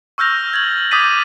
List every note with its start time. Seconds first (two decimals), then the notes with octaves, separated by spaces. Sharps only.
0.18 C#6 E6 F6 G6 A#6 F7
0.53 G#6 A6 F#7
0.91 D6 D#6 G6 A6 B6 D#7